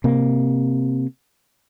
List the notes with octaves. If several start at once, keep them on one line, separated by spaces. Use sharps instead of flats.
C3 A#3